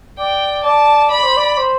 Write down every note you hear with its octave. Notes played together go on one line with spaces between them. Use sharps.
D5 G5
D5 A5
D5 B5
C5
D5
C5